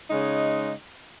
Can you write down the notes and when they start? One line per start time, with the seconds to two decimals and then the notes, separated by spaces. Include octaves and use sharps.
0.11 C#3 G#3 D#4